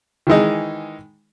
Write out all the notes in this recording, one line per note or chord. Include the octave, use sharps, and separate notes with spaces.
D#3 E3 G#3 D#4